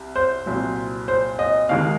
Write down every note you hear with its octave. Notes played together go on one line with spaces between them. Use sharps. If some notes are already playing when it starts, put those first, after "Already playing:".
Already playing: C2 C3
C5
C2 A#2 F#3
C5
D#5
D#2 D#3 G#3 F5